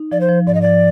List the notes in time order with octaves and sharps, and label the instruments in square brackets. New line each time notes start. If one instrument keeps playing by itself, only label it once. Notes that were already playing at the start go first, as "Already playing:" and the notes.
Already playing: [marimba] D#4
[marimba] F3 [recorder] D5
[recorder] C5
[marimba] F3
[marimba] G#2 [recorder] D5
[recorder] D#5
[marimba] F3 [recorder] D5